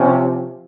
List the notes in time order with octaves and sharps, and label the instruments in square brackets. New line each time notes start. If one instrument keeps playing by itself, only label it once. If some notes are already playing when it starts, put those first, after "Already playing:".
Already playing: [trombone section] C3 F3 C4 C#4